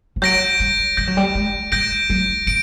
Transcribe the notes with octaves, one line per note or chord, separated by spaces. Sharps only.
F3
F#3 G6 A#6 D7
G3
G3 G6 A#6 D7
F#3
G3
G#3
G3 G6 A#6 D7
F#3
E3 D7